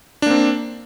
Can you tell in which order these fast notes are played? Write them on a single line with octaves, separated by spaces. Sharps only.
D4 A#3 C4